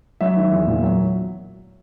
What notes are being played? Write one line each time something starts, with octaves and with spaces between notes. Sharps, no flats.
F#3 E5
D#3
E2
A#2
F#3